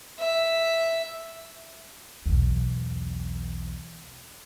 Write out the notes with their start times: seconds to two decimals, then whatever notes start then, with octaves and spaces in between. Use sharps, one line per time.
0.19 E5
2.26 B1 E2